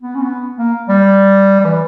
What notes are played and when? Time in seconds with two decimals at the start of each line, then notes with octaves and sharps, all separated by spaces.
0.02 B3
0.15 C#4
0.22 B3
0.58 A#3
0.89 G3
1.60 G3
1.65 E3